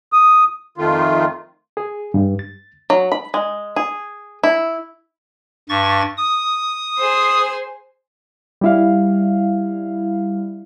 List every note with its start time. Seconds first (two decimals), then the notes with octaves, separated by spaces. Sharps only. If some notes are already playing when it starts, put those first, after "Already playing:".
0.13 D#6
0.78 F2 D#3 A3 F4
1.77 G#4
2.14 G2
2.39 A6
2.90 F#3
3.12 B5
3.34 G#3
3.76 G#4
4.43 E4
5.69 G2 C#6 A6
6.17 D#6
6.99 G#4 C5
8.61 G3 E4 F5